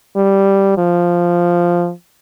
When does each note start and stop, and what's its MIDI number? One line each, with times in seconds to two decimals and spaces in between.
0.16 0.73 55
0.78 1.91 53